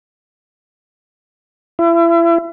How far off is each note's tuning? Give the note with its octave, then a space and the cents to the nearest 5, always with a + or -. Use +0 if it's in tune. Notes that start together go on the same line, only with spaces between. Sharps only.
E4 +35